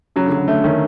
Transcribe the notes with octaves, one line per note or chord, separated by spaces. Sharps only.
C#3 F#3
D3
F#3
C#3
D3 A3
D#3 C#4